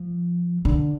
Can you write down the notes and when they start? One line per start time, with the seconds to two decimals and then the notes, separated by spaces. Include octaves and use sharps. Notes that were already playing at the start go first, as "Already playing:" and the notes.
Already playing: F3
0.65 D3